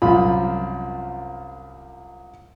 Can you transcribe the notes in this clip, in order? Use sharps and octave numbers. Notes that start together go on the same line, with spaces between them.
C2 F#2 F3 F4 B5